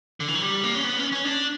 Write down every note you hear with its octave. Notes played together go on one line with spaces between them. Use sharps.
D3
E3
F#3
G3
A#3
C#4
B3
C#4
C#4
D4